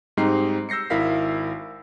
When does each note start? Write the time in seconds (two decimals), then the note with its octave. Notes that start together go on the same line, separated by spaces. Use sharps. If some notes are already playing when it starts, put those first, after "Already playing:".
0.17 G#2 G3 C4 D#4 A#5 C7
0.69 E6 G6 A#6 C7 C#7
0.90 G#1 E4 A#4 F5 B6